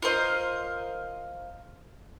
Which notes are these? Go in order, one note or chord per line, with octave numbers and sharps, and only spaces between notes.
F4 A#4 C5 D#5